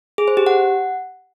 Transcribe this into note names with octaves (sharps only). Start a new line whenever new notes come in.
G#4
C5
G4
F#5